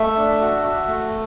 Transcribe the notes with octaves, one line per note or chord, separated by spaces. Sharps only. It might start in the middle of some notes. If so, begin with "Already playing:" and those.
Already playing: A3 E5
D4
F#4
F#4
A3